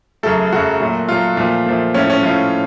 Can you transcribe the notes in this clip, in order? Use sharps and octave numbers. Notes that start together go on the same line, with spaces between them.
F#2 C#3 F#3 A3 A4
F#2 C#3 F#3 A3 F#4
A#2 F#3 A3
A#2 F#3 A3 F4
A#2 F3 A3
A#2 F3 A3
A2 F3 A3 C#4
C#4
A2 F3 A3 F4